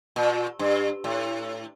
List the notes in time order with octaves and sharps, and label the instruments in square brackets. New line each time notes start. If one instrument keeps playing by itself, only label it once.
[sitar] A#2
G2
A2